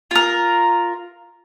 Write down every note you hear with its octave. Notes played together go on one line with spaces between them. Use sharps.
F4 A#4